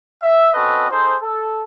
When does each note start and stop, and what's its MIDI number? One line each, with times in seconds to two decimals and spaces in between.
0.22 0.53 76
0.54 0.87 60
0.54 0.87 61
0.54 0.87 66
0.54 0.87 69
0.54 0.87 71
0.54 0.87 75
0.91 1.15 63
0.91 1.15 68
0.91 1.15 69
0.91 1.15 72
1.22 1.62 69